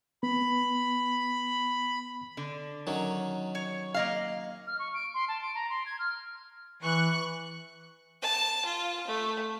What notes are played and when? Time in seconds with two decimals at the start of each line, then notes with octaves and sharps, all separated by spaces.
0.23 B3 B5
2.37 D3
2.87 D#3 F#3 C#4
3.55 C#5
3.94 A#3 D#5 F5
4.67 F6
4.79 C#6
4.94 D7
5.14 C6
5.28 A5
5.41 D7
5.55 A#5
5.70 C6
5.86 G#6
5.99 F6
6.83 E3 C#6 F#6
8.22 A5
8.65 F4
9.07 A3